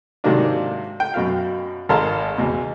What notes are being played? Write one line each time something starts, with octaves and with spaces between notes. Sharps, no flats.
G#2 C3 D#3 F#3 A#3 D4
G5
F#2 B2 F#3 F#4 F5
G#1 A#4 F5 A5 A#5 C6
E2 B2